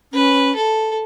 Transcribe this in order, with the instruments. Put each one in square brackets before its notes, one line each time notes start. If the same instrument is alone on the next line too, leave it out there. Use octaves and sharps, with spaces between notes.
[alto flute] C#4 [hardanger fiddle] B4
[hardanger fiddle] A4